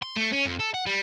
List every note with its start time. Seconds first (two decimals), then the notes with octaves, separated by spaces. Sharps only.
0.03 C6
0.16 A3
0.32 C#4
0.45 F2
0.59 A4
0.74 F#5
0.86 G3